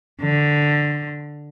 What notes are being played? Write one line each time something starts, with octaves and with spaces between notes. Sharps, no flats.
D3